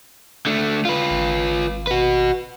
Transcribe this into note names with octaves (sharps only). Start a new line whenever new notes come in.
D3 A3
F4 B4
G#1
F#4 B4